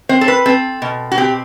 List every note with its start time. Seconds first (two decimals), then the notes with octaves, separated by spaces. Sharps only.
0.09 C4 C5
0.21 A4
0.28 B4
0.46 C4 A4
0.82 B2
1.12 F#4
1.18 C4 G4